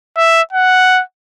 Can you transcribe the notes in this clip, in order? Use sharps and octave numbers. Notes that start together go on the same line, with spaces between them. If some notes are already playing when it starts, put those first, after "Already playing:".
E5
F#5